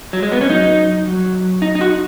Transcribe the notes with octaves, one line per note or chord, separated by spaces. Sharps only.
F#3
G#3
B3
C#4
F#3 D#4
F#3
D#4
D#4
F#4